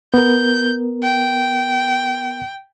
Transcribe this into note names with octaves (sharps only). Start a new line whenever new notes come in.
B3 A#4 G6
G5